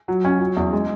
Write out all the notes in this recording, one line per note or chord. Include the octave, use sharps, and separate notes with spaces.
F#3
C#4
F#3
E2
G#3